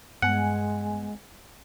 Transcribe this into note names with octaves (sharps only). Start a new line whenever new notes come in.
G2 G#3 B3 F#5 G#5